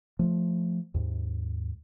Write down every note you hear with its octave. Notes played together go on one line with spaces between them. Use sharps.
F3 A3
D#2 G#2